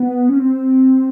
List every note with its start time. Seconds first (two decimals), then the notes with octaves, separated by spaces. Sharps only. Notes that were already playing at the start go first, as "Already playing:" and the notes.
Already playing: B3
0.29 C#4
0.39 C4